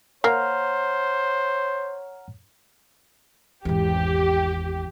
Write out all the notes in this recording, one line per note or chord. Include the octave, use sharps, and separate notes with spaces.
A#3 C5 C#5 F#5 A#5 F6
G#1 E2 G4